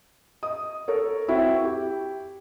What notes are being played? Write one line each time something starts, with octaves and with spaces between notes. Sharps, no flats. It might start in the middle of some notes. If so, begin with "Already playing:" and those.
D#5 D#6
A4 A#4 C#5
C4 E4 F#4
G4